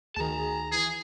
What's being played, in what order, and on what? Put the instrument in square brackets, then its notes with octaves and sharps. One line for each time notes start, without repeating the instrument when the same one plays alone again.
[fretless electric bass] D2 D#3 [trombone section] F#4 G#4 [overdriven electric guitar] A5 A#5
[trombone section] E3 [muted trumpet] G#4